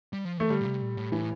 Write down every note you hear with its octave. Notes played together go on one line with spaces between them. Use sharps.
G3
F3
E3 A3
D3 G3
A#2
C3
A#2
A2
A2 E3